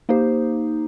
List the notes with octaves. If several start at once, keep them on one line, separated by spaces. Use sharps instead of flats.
A#3 D#4 G4 C5